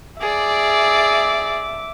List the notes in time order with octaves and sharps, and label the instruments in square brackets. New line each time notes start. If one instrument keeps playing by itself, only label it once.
[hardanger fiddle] G#4 D5 [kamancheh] E5 D6